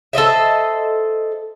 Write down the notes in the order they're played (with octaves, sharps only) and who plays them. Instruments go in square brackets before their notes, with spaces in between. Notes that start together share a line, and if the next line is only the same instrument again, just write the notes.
[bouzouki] A4 C5 D#5 E5